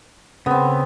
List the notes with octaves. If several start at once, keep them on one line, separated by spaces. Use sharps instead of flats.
C#3 B3 C4